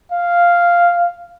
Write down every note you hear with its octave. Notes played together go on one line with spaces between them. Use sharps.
F5